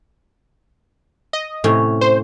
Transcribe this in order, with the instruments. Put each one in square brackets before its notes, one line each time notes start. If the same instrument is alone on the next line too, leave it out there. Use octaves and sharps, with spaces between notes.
[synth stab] D#5
[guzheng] A2 C3 C#4
[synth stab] C5